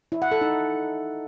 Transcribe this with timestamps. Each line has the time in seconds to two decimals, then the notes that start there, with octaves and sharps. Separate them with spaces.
0.12 E4
0.22 F#5
0.32 A4
0.41 D#4